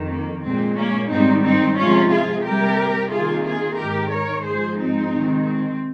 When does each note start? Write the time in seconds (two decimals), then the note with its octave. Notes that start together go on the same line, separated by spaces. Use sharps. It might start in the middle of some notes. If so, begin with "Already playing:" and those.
Already playing: F2 D#3
0.10 A#3
0.44 A#2 G#3 C4
0.77 A#3 C#4
1.10 G#2 D#3 G3 C4 D#4
1.44 C4 D#4
1.77 C3 F3 G#3 C#4 F4
2.11 F4 G#4
2.44 C3 G3 A#3 G4 A#4
3.11 C3 D#3 A#3 F4 G#4
3.45 F4 G#4
3.78 G#2 D#3 G#3 G4 A#4
4.11 A#4 C#5
4.44 G#2 F3 G#3 G#4 C5
4.78 C4 D#4
5.12 C3 D#3 G#3
5.45 C4